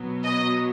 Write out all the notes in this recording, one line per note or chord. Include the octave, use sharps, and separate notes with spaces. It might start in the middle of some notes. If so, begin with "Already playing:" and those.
Already playing: B2 F#3 B3
D#5